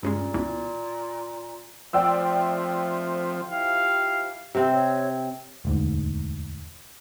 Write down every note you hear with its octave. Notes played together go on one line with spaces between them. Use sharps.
G2 A#2 C#3 G#3
C#2 B2 E3
F3 A3 C4 D5 E5 G5 E6
F3 E4 G4 F5
C3 C4
C#5
E1 D2 G#2